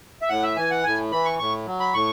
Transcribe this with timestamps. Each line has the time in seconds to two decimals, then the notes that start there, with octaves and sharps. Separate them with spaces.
0.22 E5
0.29 A2 F#5
0.43 E5
0.56 E3 G#5
0.71 F#5
0.84 A2 G#5
1.11 E3 B5
1.25 C#6
1.39 A2 C#6
1.67 F#3
1.80 B5
1.94 A2 C#6